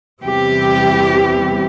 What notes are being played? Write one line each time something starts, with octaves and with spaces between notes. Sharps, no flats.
E2 C3 E3 G3 C4 G4